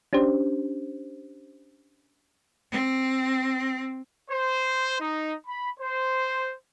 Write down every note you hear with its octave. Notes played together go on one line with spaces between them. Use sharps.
C#4 D4 G4 C5
C4
C5
D#4
B5
C5